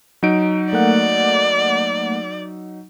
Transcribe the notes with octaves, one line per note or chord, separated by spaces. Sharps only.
F#3 D#4 D7
A3 A#3 D5 F#5